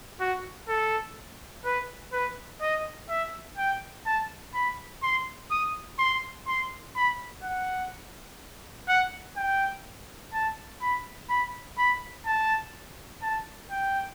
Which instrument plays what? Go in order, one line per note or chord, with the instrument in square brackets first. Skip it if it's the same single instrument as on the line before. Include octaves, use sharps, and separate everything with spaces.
[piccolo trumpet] F#4
A4
B4
B4
D#5
E5
G5
A5
B5
C6
D#6
C6
C6
B5
F#5
F#5
G5
A5
B5
B5
B5
A5
A5
G5